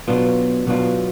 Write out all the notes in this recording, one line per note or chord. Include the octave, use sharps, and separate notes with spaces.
B2 F#3 B3 D4 F4
B2 F#3 B3 D4 F4